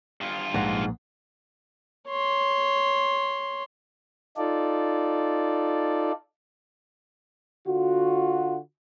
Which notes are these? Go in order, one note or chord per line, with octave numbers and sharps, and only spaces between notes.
G2 F4
A#1 G#2 A#3 F#5
C#5 C6
D#4 F4 A4 D5
D3 F4 F#4